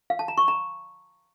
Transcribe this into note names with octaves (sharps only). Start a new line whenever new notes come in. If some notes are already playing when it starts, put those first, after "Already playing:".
F5
A5
A#5
C#6
A#5